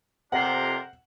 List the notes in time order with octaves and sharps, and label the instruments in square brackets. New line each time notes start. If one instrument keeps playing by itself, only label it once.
[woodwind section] F2 C3 [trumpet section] D4 A#4 C5 [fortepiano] F#5